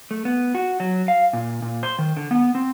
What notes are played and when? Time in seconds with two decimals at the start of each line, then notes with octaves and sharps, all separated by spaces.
0.11 A3
0.25 B3
0.55 F#4
0.80 F#3
1.08 F5
1.33 A#2
1.62 A#2
1.83 C5
1.99 D#3
2.17 D3
2.31 B3
2.55 C4